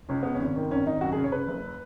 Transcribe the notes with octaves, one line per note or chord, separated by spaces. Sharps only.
C#2 C#4
C#3 B3
C#4
G#1
D#3
G#1 C#4
G#1 D#4
F#2 F#4
G#4
C#3
C#5
C#3 B4
F#1